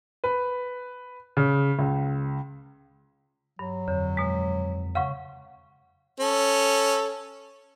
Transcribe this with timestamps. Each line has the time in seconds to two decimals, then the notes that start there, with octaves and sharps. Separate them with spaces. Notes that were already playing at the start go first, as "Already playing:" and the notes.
0.24 B4
1.37 C#3
1.79 C#2
3.59 G2 F#3
3.88 F2 D3 C#5
4.17 B2 G#3
4.95 C#3 F5 F#5 C#6
6.20 C#4 A4